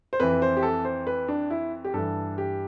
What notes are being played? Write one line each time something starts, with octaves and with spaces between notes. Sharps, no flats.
C5
F2 E3 B4
C5
G4
A4
C5
B4
D4
E4
G4
G2 E3 A4
G4